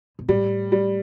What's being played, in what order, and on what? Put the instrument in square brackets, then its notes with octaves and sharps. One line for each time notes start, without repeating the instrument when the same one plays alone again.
[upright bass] B2
[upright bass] A2 [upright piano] G3
[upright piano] G3